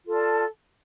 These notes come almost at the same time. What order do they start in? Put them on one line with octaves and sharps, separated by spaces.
F4 A4 D5 A5